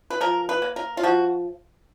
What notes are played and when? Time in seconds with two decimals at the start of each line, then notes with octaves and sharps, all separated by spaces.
0.10 B4
0.21 F3 A#4
0.49 B4
0.62 A#3
0.76 A#4
0.97 F4
1.03 F3 F#4